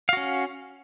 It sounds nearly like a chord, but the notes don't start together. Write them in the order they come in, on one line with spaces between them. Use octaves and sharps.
F5 F#4 C#4